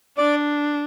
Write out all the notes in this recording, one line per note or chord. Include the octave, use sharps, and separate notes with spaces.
D4 D5